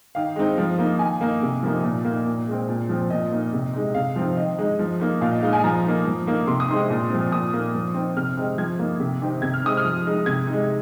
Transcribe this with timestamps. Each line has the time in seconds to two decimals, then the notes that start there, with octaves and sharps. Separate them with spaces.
0.15 D#3 F5
0.36 G#3 C4 D#4
0.58 F3
0.78 A#3 D#4
0.99 D#3 G#5
1.21 A#3 D#4
1.43 C3
1.63 F3 A#3 D#4
1.83 A#2
2.05 A#3 D#4
2.26 A#2
2.47 G#3 C4
2.69 A#2
2.89 F3 C4
3.10 A#2 D#5
3.31 A#3 D#4
3.53 C3
3.74 G#3 D#4
3.94 C3 F5
4.16 F3 C4 D#4
4.37 D#3 D#5
4.59 G#3 D#4
4.79 F3
5.00 A#3 D#4
5.21 A#2 F5
5.31 D#5
5.42 G#3 D#4 F5
5.53 G#5
5.64 F3 A#5
5.84 A#3 D#4
6.06 F3
6.27 A#3 D#4
6.47 C3 C6
6.60 D#6
6.68 G#3 C4 D#4 C6
6.90 A#2
7.10 F3 C4
7.31 A#2 D#6
7.53 A#3 D#4
7.75 F3
7.94 C4 D#4
8.17 C3 F6
8.37 D#3 G#3 C4 D#4
8.58 F3 G#6
8.79 A#3 D#4
9.00 C3
9.22 D#3 C4 D#4
9.42 C3 G#6
9.54 F6
9.63 G#3 C4 D#4 D#6
9.77 F6
9.85 F3
10.06 G#3 D#4
10.26 C3 G#6
10.47 D#4
10.53 G#3